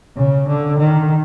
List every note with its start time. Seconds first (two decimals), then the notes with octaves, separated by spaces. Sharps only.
0.17 C#3
0.48 D3
0.79 D#3